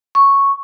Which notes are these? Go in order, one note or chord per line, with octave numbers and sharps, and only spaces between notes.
C#6